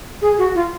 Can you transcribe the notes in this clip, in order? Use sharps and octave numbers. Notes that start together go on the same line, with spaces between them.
G#4
F#4
F4